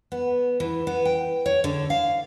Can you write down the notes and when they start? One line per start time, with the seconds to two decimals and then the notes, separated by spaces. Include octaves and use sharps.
0.12 B3
0.60 E3
0.87 B3
1.05 G5
1.46 C#5
1.64 D3
1.90 F5